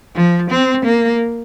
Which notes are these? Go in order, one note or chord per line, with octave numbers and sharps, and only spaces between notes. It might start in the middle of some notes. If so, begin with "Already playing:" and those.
F3
C4
A#3